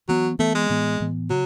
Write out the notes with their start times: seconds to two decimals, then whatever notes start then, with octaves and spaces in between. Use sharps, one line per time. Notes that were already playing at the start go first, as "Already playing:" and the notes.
0.09 E3 F#3 B3
0.39 E3 A3 B3
0.55 G#3
0.70 A2 E3 B3
1.00 A2 E3 B3
1.30 C#3 F#3